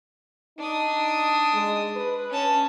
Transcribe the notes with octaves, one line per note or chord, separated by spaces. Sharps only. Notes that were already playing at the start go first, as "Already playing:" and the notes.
D4 D#4 D#6
G#3
B4
C#4 A5